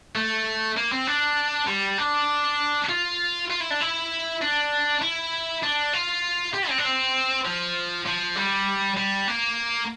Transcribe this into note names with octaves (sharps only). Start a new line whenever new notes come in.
A3
A#3
C4
D4
G3
D4
F4
F4
E4
D4
E4
D4
E4
D4
F4
G4
C4
D4
C4
F3
F3
G3
G3
A#3